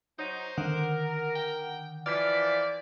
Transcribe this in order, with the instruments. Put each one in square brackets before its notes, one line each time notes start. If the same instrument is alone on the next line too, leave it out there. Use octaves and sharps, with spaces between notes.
[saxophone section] F#3 D#4 [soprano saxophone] C5
[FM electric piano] D3 D#3 F#5 [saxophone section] A#4
[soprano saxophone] G5
[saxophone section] E3 F3 [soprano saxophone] D5 [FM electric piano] F6 B6